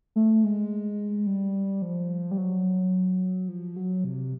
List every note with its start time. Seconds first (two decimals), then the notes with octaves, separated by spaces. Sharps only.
0.16 A3
0.44 G#3
1.27 G3
1.82 F3
2.31 G3
2.38 F#3
3.48 F3
3.76 F#3
4.04 C3